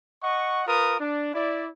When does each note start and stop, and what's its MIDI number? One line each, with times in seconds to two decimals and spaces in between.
0.22 0.60 75
0.22 0.60 78
0.22 0.60 85
0.67 0.95 65
0.67 0.95 70
0.67 0.95 71
0.67 0.95 87
0.99 1.32 62
1.34 1.66 64
1.34 1.66 74